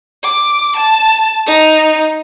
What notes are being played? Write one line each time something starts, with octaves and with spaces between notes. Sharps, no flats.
D6
A5
D#4